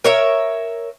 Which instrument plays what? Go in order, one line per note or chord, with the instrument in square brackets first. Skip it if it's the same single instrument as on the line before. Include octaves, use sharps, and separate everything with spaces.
[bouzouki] A#4 C#5 E5